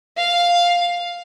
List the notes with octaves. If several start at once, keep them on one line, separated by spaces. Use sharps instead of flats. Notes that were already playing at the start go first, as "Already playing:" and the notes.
F5